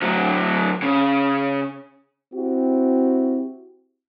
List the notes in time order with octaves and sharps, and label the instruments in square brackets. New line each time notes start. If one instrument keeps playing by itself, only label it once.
[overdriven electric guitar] D2 F#3
C#3
[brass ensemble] C4 E4 F#4 G4